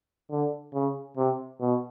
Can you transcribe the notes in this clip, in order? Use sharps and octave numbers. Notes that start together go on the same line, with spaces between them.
D3
C#3
C3
B2